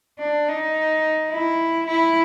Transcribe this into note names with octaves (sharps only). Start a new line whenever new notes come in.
D4
D#4
E4
E4